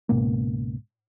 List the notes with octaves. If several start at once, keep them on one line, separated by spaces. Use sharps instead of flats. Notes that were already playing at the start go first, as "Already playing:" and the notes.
C#2 G#2 B2 A#3